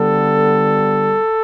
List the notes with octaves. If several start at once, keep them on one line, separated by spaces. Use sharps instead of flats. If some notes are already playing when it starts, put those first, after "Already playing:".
Already playing: D3 G3 B3 A4